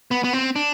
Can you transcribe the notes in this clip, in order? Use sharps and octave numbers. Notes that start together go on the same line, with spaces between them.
B3
B3
C4
D4